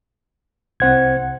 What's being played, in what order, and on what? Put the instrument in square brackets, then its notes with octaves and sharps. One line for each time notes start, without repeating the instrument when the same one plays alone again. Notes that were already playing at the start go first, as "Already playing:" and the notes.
[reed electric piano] C2 F#5 [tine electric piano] C4 C5 G#6